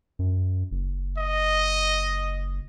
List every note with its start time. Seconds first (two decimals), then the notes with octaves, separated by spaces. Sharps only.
0.19 F#2
0.71 F#1
1.18 D#5